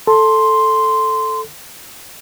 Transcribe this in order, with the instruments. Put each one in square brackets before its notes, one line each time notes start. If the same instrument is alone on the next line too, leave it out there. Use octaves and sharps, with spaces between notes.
[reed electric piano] A4 [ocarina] C6